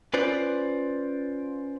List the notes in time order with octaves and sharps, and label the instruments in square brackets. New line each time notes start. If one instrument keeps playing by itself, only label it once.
[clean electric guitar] C#4 F4 B4 C5 D5